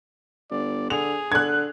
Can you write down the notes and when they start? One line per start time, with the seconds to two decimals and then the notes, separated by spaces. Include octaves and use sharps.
0.51 G1 D5
0.90 D3 G#4 F7
1.32 D3 F#6 G#6